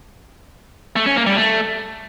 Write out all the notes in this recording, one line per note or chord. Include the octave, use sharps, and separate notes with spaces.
A3
C#4
A#3
G3
A3